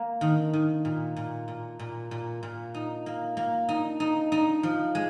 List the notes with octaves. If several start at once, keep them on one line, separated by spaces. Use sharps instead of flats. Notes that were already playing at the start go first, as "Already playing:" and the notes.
Already playing: A#3
D#3
D#3
A#2
A#2
A#2
A#2
A#2
A#2
D#4
A#3
A#3
D#4
D#4
D#4
F3
G#3